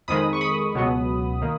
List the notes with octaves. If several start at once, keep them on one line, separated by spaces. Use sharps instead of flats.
F2 D#3 G#3 B5 D#6
C#6
B5 D#6
C#2 B2 F#3 B3
D#3 A#3